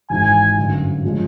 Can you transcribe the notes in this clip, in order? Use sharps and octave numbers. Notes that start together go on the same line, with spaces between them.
G#1 G#2 E3 G#5
G1 F#2 D3
C#3 F3 G#3 C#4